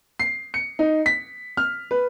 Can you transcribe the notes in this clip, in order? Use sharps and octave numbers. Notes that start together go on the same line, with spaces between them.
C7
C#7
D#4
B6
F6
B4